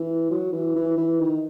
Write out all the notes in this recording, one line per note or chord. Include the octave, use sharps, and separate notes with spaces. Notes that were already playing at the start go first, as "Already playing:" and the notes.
Already playing: E3
F#3
E3
E3
E3
D#3